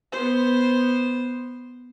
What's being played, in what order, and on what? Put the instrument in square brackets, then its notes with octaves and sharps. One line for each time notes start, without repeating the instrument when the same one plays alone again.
[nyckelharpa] B3 C5